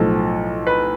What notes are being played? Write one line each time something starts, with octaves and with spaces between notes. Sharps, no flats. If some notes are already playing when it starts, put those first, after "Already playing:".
Already playing: B1 A2 F3 A4
B4